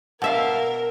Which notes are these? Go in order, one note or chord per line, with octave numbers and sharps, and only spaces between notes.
B2 A#4 E5 F5